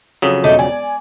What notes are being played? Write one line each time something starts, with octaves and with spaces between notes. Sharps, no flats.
F2 C#3 F#3 D#6
E1 A3 D4 D#4
D5 G#5